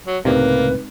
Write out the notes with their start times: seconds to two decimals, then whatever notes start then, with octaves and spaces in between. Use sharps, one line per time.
0.07 F#3
0.25 C#2 A2 C3 G#3 A#3 C4 D#4 B4